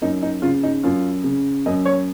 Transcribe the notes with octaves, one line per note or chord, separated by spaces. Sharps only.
F#2 D#4
D#4
C#3 F4
D#4
F#2 F4
C#3
F#2 D#5
C#5